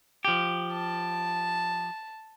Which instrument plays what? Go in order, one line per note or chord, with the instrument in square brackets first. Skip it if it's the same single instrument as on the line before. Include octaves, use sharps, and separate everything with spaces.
[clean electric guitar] F3 G4
[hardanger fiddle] A5